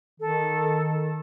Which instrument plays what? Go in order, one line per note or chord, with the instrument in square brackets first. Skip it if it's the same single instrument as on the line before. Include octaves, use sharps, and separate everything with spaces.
[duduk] D#3 [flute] A4